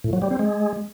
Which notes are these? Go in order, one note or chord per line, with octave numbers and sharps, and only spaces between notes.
A2
F#3
G3
C4
G#3